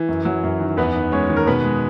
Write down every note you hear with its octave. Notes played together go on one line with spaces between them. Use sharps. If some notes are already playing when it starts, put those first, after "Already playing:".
Already playing: E3
F#2
F#3
F#2
D#3
E2 B3 B4
D#3
G#3 C#4 C#5
D#3
A#4
B2 B3 B4
G#3